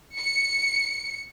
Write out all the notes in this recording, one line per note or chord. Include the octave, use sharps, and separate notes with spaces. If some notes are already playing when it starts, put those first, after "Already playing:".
C#7